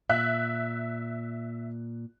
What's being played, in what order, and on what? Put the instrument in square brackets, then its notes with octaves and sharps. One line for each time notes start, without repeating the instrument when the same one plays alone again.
[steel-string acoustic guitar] A#2 [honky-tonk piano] E5 F#6